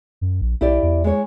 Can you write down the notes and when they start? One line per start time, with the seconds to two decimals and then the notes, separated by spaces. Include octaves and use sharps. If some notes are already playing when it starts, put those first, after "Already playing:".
0.21 F#2
0.41 A#1
0.61 B1 E4 G4 D5
0.83 E2
1.04 G#3 C#5